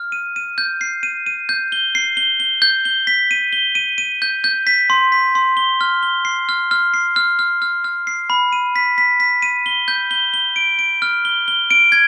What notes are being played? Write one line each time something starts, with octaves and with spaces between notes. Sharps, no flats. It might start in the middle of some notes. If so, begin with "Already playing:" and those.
Already playing: F6
D#7
D#7
G6
C7
D#7
D#7
G6
G7
C7
G7
G7
G6
G7
B6
D#7
G7
D#7
D#7
G6
G6
B6
C6
B6
C6
G7
F6
G7
C7
F6
F6
C7
F6
F6
F6
F6
C7
B5
D#7
B6
B6
B6
D#7
G7
G6
G7
G7
D7
D7
F6
G7
G7
D7
G#6